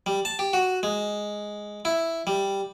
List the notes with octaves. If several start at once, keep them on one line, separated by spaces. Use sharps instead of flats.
G3
A5
G4
F#4
G#3
E4
G3